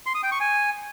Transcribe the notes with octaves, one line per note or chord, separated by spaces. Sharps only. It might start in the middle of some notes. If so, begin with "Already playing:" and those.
C6
D#6
G5
C#6
G#5